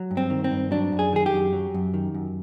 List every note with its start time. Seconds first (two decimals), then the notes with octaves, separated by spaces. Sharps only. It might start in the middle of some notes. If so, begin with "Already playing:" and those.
Already playing: F#3
0.11 G2
0.17 C4
0.30 D#3
0.44 C4
0.51 G2
0.71 F#3 D4
0.92 F#2
0.99 G#4
1.13 D#3 G#4
1.26 G4
1.33 F#2
1.53 F#3
1.74 F#2
1.94 D#3
2.14 F#2